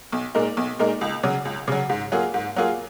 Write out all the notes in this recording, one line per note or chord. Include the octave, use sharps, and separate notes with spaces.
B1
A#2 G#3 D#4 A#4
B1
A#2 G#3 D#4 A#4
C#2
C#3 F#3
C#2
C#3 F#3
G#2
F#3 A#3 F4 G#4
G#2
F#3 A#3 F4 G#4